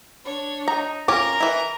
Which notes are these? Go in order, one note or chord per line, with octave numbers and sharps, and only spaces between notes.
D4 C#5
D#4 A#5
C#4 F4 A#4 A#5 D6
E3 E4